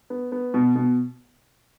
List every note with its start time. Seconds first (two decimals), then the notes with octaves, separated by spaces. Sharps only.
0.10 B3
0.32 B3
0.54 B2
0.75 B2